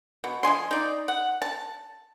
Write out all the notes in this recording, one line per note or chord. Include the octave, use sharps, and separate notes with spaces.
B2
F3 D#5 G#5 C6
D#4 D5
F#5
A5